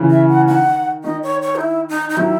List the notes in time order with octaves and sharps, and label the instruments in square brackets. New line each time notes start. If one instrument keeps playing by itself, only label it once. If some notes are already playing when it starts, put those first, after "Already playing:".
Already playing: [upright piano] C#3 E3
[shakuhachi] E5
F#5
[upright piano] D#3 [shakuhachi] F#5
[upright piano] D#3 [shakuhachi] D#5
[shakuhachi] C#5
C#5
D#4
E4
D#4
D#4
[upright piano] D#3 F#3 [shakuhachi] E4